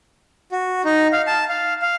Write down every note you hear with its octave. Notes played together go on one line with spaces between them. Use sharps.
F#4
D#4
F5
A5
F5
F5